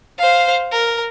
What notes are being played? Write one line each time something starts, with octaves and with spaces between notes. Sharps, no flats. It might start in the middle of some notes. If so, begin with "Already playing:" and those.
C5 F5
A#4